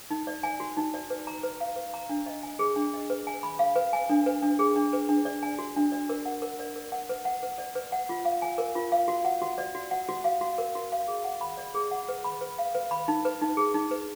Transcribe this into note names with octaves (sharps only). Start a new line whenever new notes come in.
D#4
D5
G#5
F#4
D#4
D5
B4
A#5
B4
F5
B4
A#5
D4
D#5
G#5
G#4
D4
D#5
B4
G#5
B5
F5
B4
G#5
D4
B4
D4
G#4
D4
B4
D4
D5
G#5
F#4
D4
D5
A#4
F#5
A#4
D5
A#4
F#5
B4
F#5
B4
D5
B4
F#5
F4
F5
G#5
A#4
F4
F5
F#4
F#5
F#4
D5
F#4
F#5
F#4
F5
F#4
A#4
F#4
F5
G#4
F#5
B5
D5
G#4
F#5
B4
B5
B4
F5
B4
B5
D#4
B4
D#4
G#4
D#4
B4